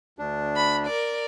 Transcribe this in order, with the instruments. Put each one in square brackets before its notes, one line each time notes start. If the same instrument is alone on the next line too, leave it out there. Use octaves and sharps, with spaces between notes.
[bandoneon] D2 D4
[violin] B5
A#4 D5